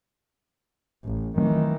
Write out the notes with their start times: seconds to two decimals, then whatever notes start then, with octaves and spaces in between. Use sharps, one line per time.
1.04 A1
1.38 D#3 E3 F#3 A3 C4